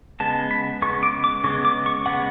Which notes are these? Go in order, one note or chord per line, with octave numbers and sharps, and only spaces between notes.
C#3 G#3 B3 A5
B5
C#3 G#3 B3 C#6
D6
D6
C#3 G#3 B3 C#6
D6
C#6
C#3 G#3 B3 F#5